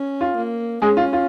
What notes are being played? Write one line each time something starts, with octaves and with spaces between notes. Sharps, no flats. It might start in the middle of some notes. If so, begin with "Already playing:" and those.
Already playing: C#4
F4
A#3
G#3 C#4 G#4
F4
F4